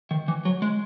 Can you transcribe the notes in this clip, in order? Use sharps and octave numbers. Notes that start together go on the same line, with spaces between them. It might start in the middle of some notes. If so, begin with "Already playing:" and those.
D#3
E3
F#3
G#3